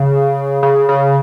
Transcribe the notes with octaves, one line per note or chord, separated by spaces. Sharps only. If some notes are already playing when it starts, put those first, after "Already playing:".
Already playing: C#3
C#3
C#3